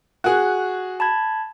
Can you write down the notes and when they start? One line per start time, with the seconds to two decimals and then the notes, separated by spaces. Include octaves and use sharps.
0.24 F#4 G#4 F#6
1.00 A5 B5 G#6